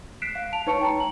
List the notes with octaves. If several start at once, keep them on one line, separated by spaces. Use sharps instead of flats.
F#6 B6 C7 D7 E7
F5
A5 D7 F7
D#4 B4 C#5 A5 C#6 C#7
G5 A5 A#5
A#5 F#7